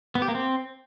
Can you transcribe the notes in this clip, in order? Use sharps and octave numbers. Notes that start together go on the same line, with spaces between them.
B3
G4
A#3
C4